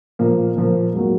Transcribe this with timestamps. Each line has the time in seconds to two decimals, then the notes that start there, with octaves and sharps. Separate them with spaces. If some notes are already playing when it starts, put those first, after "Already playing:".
0.19 A#2 F3 A#3
0.56 A#2 F3 A#3
0.94 G#2 F#3 A#3